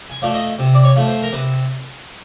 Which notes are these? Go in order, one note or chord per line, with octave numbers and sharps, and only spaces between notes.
G#5
F3 A3 D5
D#5
C3
D5
C#5
F3 A3
C5
A#4
C3 B4